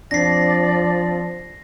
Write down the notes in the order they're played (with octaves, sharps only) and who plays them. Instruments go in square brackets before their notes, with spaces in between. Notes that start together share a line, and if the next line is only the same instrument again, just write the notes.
[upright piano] F2 D4 [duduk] F3 [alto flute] D5 [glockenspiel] A#6 C7